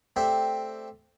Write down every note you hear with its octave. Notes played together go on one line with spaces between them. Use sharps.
A3 C4 G4 D5 E5 G5